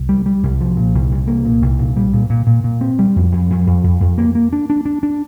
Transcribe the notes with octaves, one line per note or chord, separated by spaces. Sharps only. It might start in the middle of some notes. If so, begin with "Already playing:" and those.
Already playing: C2
G3
G3
C2
F3
A#2
C2
C2
A#3
A#2
C2
A#2
G3
A#2
A#2
A#2
A#2
C4
G3
F2
F2
F2
F2
F2
F2
A#3
A#3
D4
D4
D4
D4